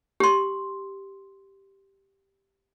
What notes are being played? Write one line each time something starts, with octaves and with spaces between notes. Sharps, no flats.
G4 C6